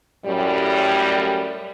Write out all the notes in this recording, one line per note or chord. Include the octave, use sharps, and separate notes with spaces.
F#2 A2 G3